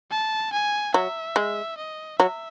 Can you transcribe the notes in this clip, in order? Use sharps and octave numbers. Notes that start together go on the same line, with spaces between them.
A5
G#5
F#3 E5
G#3
D#5
F#3 E5